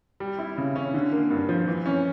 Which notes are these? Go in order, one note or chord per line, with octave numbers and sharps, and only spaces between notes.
G3
E4
C#3
C#4
D3
A#3
G2
F3
E3
C#4